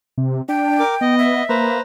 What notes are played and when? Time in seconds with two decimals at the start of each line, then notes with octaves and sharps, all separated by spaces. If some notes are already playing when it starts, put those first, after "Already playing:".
0.18 C3
0.49 D4 G5
0.80 A#4 D6
1.01 B3 D#5
1.19 E5
1.49 A#3 B4 C5 A#5